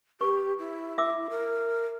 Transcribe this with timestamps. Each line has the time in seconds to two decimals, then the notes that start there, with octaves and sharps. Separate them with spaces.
0.21 G4 B4 C#6
0.58 E4
0.98 E5 D6 E6
1.30 A#4